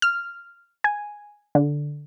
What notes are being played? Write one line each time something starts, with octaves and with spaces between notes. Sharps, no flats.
F6
G#5
D3